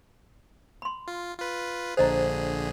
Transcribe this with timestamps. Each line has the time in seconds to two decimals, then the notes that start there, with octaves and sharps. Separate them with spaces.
0.82 B5 C6
1.08 F4
1.38 F4 B4
1.97 A#1 D3 G#4 C5 D#5 A#5